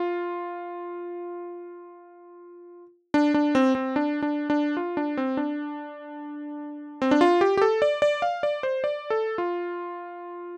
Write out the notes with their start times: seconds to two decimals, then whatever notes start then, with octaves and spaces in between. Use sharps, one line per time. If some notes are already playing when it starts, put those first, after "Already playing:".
Already playing: F4
3.14 D4
3.34 D4
3.55 C4
3.75 C4
3.96 D4
4.22 D4
4.50 D4
4.77 F4
4.97 D4
5.17 C4
5.37 D4
7.02 C4
7.11 D4
7.21 F4
7.41 G4
7.57 G4
7.62 A4
7.82 D5
8.02 D5
8.22 F5
8.43 D5
8.63 C5
8.84 D5
9.10 A4
9.38 F4